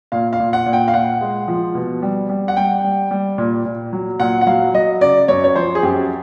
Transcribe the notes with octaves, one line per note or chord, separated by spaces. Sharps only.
A#2 F5
F5
A#2
F#5
A#2
G5
F5
A#2 F#5
G#3
F3
B2
G3
G3
F#5
G3 G5
G3
G3
A#2
A#2
F#3
A#2 F#5
F#5
F#3 F5
F#3 D#5
C#3 D5
F#2 C#5
C#5
F3 C5
G#4
F#2 G4